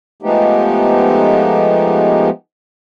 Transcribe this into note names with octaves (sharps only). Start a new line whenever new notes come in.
F3 G#3 A3 B3 D#4 G4